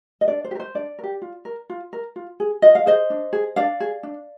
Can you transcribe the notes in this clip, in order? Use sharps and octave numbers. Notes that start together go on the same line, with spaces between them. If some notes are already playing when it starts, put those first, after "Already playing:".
D#5
D4 D5
C5
G4
A#4
C5
D4 D5
A#4
G4
F4
A#4
F4
A#4
F4
G#4
F4 D#5
F5
G#4 C5 D#5
D4
G#4
D4 D5 F5
G#4
D4